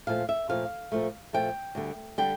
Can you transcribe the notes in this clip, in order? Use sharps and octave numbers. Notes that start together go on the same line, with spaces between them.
A#2 F3 A3 F5
E5
A#2 F3 A3 F5
A#2 F3 A3
A#2 F3 A3 G5
D2 D3 G3
D3 G3 G5